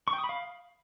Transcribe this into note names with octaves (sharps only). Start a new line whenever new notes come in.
C#6
G5
D#6
B5
F5